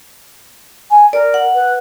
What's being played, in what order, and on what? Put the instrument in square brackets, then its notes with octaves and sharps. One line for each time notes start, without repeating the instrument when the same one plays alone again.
[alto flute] G#5
[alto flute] A#4 [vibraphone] D5
[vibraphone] F#5
[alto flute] B4